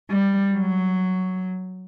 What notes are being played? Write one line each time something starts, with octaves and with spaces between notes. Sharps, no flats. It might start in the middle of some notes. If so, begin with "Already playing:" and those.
G3
F#3